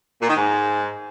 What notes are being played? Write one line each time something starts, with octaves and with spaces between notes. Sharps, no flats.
A#2
D#3
G#2